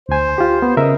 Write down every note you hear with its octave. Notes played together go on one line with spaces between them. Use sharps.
D2 C5 G#5
F4 G4
B3
C#3 A#4 D#5 E5